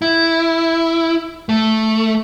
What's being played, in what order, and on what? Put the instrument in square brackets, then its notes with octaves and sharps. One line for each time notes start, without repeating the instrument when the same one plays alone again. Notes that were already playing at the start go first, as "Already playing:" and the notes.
[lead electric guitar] E4
A3